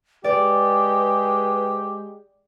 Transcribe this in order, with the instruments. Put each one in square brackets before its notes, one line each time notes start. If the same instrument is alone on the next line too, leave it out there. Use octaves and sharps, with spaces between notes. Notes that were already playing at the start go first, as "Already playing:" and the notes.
[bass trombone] G#3 [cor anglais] G4 [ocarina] B4 [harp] D5